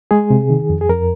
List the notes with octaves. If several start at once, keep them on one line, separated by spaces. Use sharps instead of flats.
G#3 G#4
C3
D#3
F2
G#4
F2 A#4